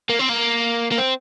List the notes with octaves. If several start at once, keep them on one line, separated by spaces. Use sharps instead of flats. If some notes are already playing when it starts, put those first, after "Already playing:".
A#3
C4
A#3
A#3
C4